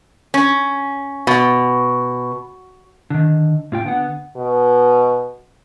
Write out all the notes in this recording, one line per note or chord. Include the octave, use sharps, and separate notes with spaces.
C#4
B2
D3 D#3
A2 F4 G5
D3 B3 F#5
B2